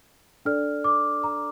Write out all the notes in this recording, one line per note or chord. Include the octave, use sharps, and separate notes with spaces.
D4 A4 D5 F6
D6
A#5